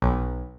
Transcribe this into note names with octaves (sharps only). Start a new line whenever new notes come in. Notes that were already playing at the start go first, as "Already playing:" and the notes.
B1